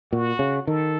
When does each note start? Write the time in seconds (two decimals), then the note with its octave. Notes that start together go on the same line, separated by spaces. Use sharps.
0.12 A#2 F#4
0.39 C#3
0.67 D#3 A4